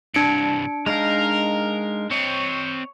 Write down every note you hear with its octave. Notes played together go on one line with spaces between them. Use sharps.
C2 G2 D4 C#7 D7
G#3 D#4 A#4 F5
C4 C#5 D#5